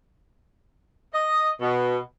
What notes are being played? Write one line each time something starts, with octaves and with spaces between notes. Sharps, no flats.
D#5
B2